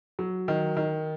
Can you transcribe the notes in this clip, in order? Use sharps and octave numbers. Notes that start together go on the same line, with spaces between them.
F#3
D#3
D#3